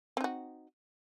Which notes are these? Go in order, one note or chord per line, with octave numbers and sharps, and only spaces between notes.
C4 D#4 F#4